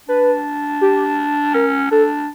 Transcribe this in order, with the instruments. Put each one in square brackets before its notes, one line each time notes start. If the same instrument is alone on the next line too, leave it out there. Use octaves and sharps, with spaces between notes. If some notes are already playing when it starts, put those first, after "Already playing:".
[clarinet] D4 [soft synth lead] B4
[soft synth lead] G4
[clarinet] C#4 [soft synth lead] A#4
[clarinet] D4 [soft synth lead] A4